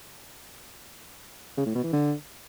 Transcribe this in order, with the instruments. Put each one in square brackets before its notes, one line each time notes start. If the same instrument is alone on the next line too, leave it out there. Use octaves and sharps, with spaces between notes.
[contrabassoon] C#3
A2
B2
E3
D3